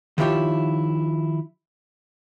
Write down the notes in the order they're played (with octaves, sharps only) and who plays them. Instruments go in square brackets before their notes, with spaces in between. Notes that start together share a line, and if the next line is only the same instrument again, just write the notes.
[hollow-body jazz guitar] D#3 F3 E4 F4 G4 C#5